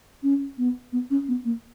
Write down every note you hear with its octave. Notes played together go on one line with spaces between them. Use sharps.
C#4
B3
B3
C#4
B3
A#3